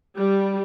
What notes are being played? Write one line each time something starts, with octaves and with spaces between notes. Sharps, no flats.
G3